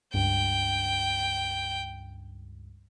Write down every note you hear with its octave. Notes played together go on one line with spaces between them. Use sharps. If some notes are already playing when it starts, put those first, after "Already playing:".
C#2 G2 G5